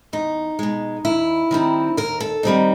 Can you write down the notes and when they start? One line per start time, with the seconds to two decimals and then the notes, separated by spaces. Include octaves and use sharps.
0.13 E2 D#4
0.59 B2 G#3
1.05 D#2 E4
1.51 D#3 G3 C4 D#4
1.97 D#2 A#4
2.20 A4
2.43 D#3 G3 C4 D#4